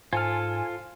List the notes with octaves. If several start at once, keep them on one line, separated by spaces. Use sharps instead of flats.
G#2 F4 A4 C5 G#5 F6